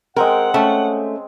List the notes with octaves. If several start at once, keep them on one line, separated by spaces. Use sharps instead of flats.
G#3 C4 A#4 F#5 G5
A3 C#4 A5